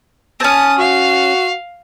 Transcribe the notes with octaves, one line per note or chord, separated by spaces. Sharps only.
C4 C#4 A5 D#6
F#4 F5